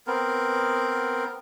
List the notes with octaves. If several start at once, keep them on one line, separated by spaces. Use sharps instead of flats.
B3 C4 A#4